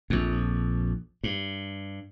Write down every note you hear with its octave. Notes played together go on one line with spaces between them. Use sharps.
A#1 F2
G2